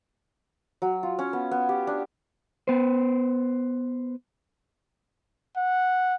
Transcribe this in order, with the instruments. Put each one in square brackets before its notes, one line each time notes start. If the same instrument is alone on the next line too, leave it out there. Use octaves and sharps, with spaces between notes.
[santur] F#3
F4
C#4
B3
B3
G4
D4
[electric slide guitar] B3 C5
[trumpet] F#5